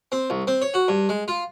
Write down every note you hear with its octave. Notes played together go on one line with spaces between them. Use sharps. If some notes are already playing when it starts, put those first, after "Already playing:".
C4
C2
C4
C#5
F#4
G2
G#3
F4